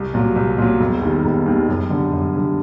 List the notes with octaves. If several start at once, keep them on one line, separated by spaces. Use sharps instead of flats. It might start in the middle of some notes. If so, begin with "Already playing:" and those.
Already playing: C2
A#2 F#3
C2
A#2 F#3
E1
D#2 D#3 G3
E1
D#2 D#3 G3
F#2
D3 G3
F#2
D3 G3